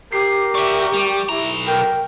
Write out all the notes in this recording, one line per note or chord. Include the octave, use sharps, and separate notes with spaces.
G4 A#4 C7
D5 E5 C#6
G3
B1 E4 A#5
A#4 G5